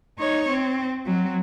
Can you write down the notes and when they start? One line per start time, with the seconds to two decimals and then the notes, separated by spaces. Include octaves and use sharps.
0.18 D#4 C#5
0.49 C4
1.06 F#3 C4